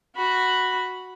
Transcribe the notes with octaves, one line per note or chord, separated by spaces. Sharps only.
F#4 B5